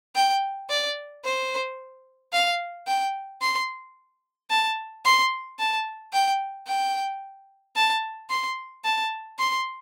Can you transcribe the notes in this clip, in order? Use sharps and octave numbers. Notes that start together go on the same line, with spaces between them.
G5
D5
C5
F5
G5
C6
A5
C6
A5
G5
G5
A5
C6
A5
C6